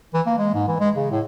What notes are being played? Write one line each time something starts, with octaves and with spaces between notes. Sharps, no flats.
E3
A#3
G#3
G#2
E3
G#3
C#3
A2